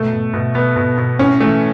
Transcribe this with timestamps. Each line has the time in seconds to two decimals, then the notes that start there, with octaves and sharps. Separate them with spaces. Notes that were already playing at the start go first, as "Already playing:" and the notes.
Already playing: B2 A3
0.13 B2
0.34 B2
0.55 B2 B3
0.76 B2
0.98 B2
1.19 A2 C#4
1.40 E3 A3